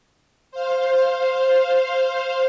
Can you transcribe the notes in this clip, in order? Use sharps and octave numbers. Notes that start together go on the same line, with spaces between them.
C5 F5